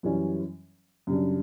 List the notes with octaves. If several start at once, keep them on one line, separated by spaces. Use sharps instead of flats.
F#2 E3 G3 C#4
F#2 C#3 G3 D4